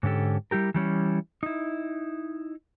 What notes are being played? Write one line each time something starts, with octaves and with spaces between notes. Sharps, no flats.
G#2 D3 C#4 G4 A4
G3 E4 G4 A#4
E3 G3 C#4 E4
D#4 E4